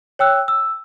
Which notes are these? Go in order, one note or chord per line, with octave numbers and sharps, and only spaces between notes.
C#5 G5 E6 F#6
E6